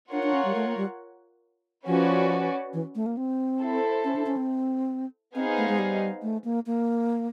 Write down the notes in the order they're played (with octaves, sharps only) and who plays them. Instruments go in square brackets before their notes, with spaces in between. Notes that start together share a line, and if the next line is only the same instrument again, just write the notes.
[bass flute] D4 [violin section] F4 A#4 C#5 F#5
[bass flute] D4
C#4
G3
A3
A#3
G3
[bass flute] F3 [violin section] C#4 F#4 B4 D5
[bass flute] E3
A3
A#3
C4
[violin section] E4 A4 C5
[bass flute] C#4
D4
C#4
C4
[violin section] B3 D#4 G#4 C5 F5 [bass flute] C4
[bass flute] A3
G#3
G3
A3
A#3
A#3